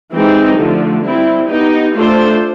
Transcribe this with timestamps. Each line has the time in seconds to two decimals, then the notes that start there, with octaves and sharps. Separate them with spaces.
0.12 E3 G#3 C4 D#4 G4
0.57 D3 F3 A3
1.03 G3 C4 E4
1.48 B3 D#4 G4
1.94 A3 D4 F4 A4 C5